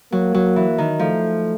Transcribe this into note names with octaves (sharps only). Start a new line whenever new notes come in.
F#3 A#3
F#3
E3
D#3
F3 A3